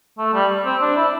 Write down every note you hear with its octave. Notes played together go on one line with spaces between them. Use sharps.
A3
G3
C4
D4
E4